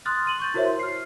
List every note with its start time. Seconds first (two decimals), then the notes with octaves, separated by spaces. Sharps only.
0.05 C6 D#6 F6 F#6 A6
0.26 C6 D#7 F#7
0.39 C#6 G6 A6
0.54 E4 F#4 A#4 C5 C#5 E5
0.66 C6
0.79 F6 C7